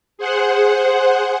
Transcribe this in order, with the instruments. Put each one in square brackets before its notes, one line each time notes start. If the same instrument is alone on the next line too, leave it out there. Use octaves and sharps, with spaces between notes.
[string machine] G#4 C5 F#5